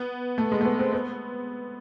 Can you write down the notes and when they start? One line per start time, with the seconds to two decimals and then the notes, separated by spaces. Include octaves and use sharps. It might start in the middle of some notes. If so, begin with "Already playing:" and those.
Already playing: B3
0.38 A3
0.52 G#3
0.61 A3
0.65 B3
0.79 C4
0.92 B3